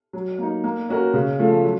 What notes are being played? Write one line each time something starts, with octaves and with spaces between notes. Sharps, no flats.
F#3
A#3 D#4
A#3
C#4 F#4 A#4
C#3
F3 A3
F#3